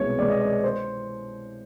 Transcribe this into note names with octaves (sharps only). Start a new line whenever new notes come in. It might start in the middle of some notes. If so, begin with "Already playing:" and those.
Already playing: C2 B2 G#3 B3 C#5
B2 G#3 B3 D5
D#5
D5
C5